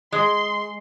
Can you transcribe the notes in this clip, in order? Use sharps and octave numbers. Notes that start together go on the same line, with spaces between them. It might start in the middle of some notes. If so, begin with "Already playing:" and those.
G#3 C6